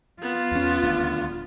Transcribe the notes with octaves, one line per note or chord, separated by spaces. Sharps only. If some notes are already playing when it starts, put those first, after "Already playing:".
B3 F4
E2 C#4
D#1 D2 D4